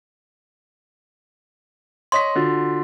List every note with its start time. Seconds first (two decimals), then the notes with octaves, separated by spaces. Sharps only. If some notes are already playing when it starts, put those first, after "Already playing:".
2.12 C#5 D#5 C6 B6
2.35 D3 F4 F#4 A6